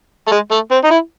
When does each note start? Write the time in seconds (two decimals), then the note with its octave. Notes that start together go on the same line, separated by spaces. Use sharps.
0.27 A3
0.31 G#3
0.51 A3
0.71 C4
0.84 D#4
0.91 E4